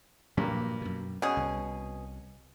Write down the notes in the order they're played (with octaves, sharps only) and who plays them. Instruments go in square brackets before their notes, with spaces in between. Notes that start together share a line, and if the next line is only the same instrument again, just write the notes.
[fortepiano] G2 A#3 [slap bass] A#2 F3 F#3
[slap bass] F#2 B2
[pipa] B2 G#4 [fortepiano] C#4
[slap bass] C2